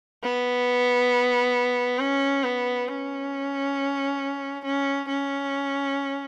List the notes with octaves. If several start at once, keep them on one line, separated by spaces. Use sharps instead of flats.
B3
C#4
B3
C#4
C#4
C#4